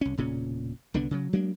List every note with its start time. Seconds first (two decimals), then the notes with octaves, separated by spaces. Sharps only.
0.01 C2 C#4
0.17 E1 A#2 C#3 C#4
0.94 C2 D3 B3 D4
1.11 C#3 F#3
1.33 F#3 G#3 A#3 D4